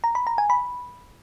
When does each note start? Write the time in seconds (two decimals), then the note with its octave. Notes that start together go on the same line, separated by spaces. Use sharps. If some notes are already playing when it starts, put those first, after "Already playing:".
0.04 A#5
0.15 B5
0.27 A#5
0.38 G#5
0.50 B5